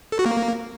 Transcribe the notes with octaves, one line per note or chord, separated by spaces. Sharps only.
A4
F#4
A#3